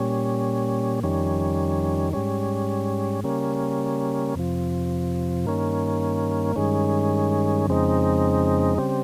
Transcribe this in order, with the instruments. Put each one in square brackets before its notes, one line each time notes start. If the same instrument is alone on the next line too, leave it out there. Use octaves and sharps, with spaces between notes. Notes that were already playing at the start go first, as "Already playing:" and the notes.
Already playing: [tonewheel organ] A#2 G3 C#4
F2 D#3 G3 C#4
G#2 G3 C#4
C#3 G3 A#3 C#4
F2 C3 F3
G2 D#3 A#3 C#4
G2 D#3 G#3 C#4
F2 C#3 G#3 C4 D#4
C#3 G3 C4